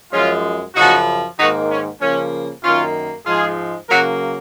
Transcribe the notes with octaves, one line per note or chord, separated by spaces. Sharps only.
F#2 F3 G#3 C#4 F4
F#2 C#3 F3 D#4 F#4
G#2 D#3 A#3 D#4 F#4
C#4
C#3 F3 A#3 C#4
F#2 D#3 A#3 C#4 F4
G#2 F3 G#3 F4 G#4
C#3 F#3 A#3 F#4 A#4